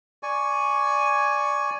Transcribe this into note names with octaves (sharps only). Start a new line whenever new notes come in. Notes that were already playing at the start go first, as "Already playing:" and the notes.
D5 G#5 C#6